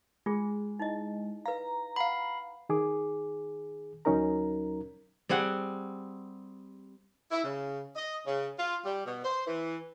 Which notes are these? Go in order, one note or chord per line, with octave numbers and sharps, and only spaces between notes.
G#3 F4 G#4
D#4 E4 D#5
B4 F5 A#5
F5 F#5 B5
D#3 G#4 D6
D2 F#3 C#4 D#4 A#4 A#5
G3 C4 G#4 F#5
E4
C#3
D#5
C#3
F4
G3
B2
C5
E3